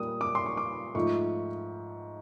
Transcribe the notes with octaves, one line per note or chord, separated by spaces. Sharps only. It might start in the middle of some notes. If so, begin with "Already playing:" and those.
Already playing: A#2 G3 A#3 D#6
D6
C6
C#6
D6
G#2 F3 A3 C#6